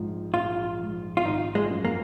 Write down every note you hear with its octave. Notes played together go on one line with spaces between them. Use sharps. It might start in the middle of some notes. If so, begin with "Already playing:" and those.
Already playing: A#1 G#2 F3
A#1 F4
G#2 F3
F4
G#1 D#4
G#3
F#2 F3 G#3 C#4
A#3